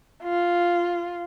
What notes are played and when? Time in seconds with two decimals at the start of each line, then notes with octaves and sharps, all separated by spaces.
0.23 F4